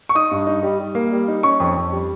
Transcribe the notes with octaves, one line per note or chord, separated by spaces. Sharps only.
C#6
D#4 D#6
G2
D#4
G3
G3
A#3
G3
D#4
C#4 C#6
F2
F2
G3